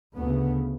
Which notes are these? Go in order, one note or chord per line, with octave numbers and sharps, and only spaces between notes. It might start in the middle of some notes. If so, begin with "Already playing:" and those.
D2 C#3 B3